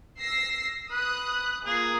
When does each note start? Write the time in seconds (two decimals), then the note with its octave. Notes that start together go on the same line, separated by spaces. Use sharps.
0.19 E6 A#6 C7
0.91 B4 D#6 F#6
1.66 A#3 F4 G#4